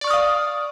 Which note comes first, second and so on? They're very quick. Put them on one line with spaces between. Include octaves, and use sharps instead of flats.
D5 C#6 F6 D#6 F5